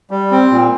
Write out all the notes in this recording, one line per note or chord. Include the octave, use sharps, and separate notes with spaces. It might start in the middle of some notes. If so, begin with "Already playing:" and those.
G3
C4
A#2